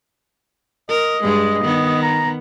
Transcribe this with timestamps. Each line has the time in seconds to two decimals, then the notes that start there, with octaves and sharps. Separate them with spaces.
0.90 A#4 D#5
1.23 G2 G#3
1.63 D#3 B3
2.02 A#5